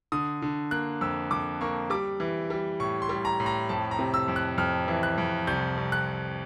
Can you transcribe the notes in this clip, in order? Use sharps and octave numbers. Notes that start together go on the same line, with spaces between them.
D3 D#6
D3
A#3 F#6
F2 E6
F2 D6
A#3 C#6
G3 D6
E3
G3
A2 C#6
C6
G3
A#5
A2
A#5
F2 A5
A#5
C3
E6
F2
F#6
F2 F6
E3
F#6
F2
C2 G6
C2
F#6